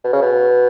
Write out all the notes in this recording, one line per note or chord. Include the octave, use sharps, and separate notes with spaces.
B2
C#3
B2